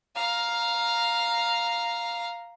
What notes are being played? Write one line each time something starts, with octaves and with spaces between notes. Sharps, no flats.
F5 A#5